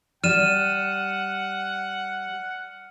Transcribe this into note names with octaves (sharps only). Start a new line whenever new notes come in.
G3 F#5 F6 D#7 E7